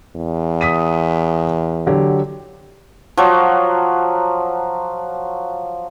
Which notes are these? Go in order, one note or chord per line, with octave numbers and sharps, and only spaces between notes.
E2
D#6 B6 D#7
D3 F#3 G4
F3 F#3